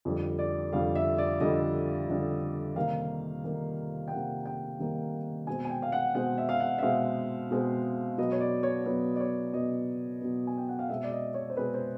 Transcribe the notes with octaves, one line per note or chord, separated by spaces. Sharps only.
F2 D3 G3
D5
F2 D3 G3 F5
E5
D5
F2 D3 G3 D#5
F2 D3 G3
C3 D#3 G3 A#3 F5
C3 D#3 G3 A#3
G5
C3 D#3 G3 A#3 F#5
G5
C3 D#3 G3 A#3
B2 G#3 C4 G#5
G#5
G5
F5
F#5
B2 G#3 C4 F#5
E5
F5
F#5
E5
B2 G#3 C4 F5
B2 G#3 C4
B2 F#3 B3 D#5
C#5
D5
C#5
B2 F#3 B3 C#5
D5
C#5
B2 F#3 B3 D#5
B2 F#3 B3
G#5
G5
F#5
F5
B2 G#3 C4 E5
D5
D#5
C#5
C5
B2 G#3 C4 B4
C5